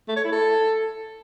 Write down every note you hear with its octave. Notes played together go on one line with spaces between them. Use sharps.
A3
C#5
E4
A4